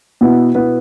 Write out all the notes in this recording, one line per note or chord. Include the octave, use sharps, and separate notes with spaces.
B2 B3 E4 B4
B2 B3 E4 B4